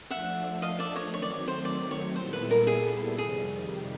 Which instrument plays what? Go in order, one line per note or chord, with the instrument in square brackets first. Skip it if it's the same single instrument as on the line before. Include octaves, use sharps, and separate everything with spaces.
[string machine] F3 A3 D4 [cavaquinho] E5 F#5
[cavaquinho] D#5 F5
D5 E5
C#5 D#5
[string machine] D#3 F#3 A3 C4 [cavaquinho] C#5
[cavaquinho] D5
C#5
C5
D5
C#5
[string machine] A#2 G3 B3 E4 A4 [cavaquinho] C5
[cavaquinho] B4
A#4
G#4
[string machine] F2 C3 D#3 G3 [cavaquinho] G#4